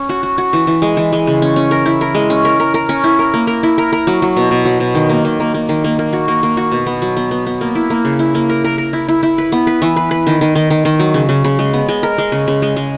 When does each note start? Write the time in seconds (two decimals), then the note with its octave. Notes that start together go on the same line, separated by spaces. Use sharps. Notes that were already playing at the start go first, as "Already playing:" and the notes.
Already playing: C#4
0.09 F#4
0.23 F#4
0.38 F#4
0.53 E3
0.67 E3
0.82 G#3
0.97 E3
1.13 G#3
1.27 C#3
1.42 C#4
1.56 C#4
1.71 A#4
1.86 E4
2.01 A#4
2.15 G#3
2.30 C#4
2.45 A#4
2.60 A#4
2.74 A#4
2.89 C#4
3.04 E4
3.19 A#4
3.34 A#3
3.47 A#4
3.63 E4
3.78 A#4
3.93 A#4
4.07 F#3
4.22 F#3
4.37 B2
4.51 B2
4.65 F#3
4.80 B2
4.95 D#3
5.10 A#3
5.25 D#3
5.40 A#3
5.54 A#3
5.69 D#3
5.84 A#3
5.99 A#3
6.13 F#4
6.28 A#3
6.43 A#3
6.57 F#4
6.72 B2
6.86 B3
7.02 F#3
7.17 B3
7.31 B3
7.46 B3
7.61 A#3
7.75 E4
7.90 A#3
8.05 C#3
8.19 E4
8.35 A#3
8.49 A#4
8.64 A#4
8.78 A#4
8.93 E4
9.08 E4
9.23 E4
9.38 B4
9.52 B3
9.67 B4
9.82 E3
9.96 B4
10.11 B4
10.27 D#3
10.41 D#3
10.55 D#3
10.70 D#3
10.85 D#3
11.00 F#3
11.14 C#3
11.29 C#3
11.44 C#3
11.59 G#3
11.73 B3
11.89 G#3
12.03 A#4
12.18 G#3
12.32 C#3
12.48 C#3
12.62 G#3
12.76 G#3